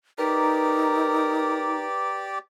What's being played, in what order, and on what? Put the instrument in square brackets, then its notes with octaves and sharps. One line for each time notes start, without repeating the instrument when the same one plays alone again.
[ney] D#4 [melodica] G4 D5 [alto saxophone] A#4 [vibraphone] B4 A#5